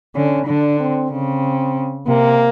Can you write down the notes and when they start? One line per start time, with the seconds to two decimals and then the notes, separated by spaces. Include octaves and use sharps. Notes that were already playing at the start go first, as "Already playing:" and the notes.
0.15 D3 C#4
0.47 D3 D4
0.80 C4
1.11 C#3 C4
2.07 C3 A#3